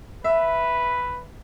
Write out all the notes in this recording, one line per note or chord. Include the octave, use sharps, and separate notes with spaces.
B4 E5